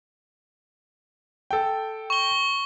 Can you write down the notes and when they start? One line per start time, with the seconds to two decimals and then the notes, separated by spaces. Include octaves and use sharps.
1.51 A4 G5
2.10 C#6 G7